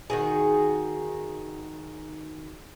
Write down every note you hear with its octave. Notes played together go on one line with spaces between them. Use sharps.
D#3 F#4 G#4